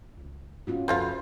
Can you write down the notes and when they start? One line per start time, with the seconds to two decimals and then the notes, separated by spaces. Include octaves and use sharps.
0.17 C#2
0.67 G#2 B3 C#4 F4 F#4
0.88 C2 F#2 F3 F#3 A3 F4 B4 C5